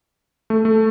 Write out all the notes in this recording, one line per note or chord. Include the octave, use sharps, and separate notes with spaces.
A3
A3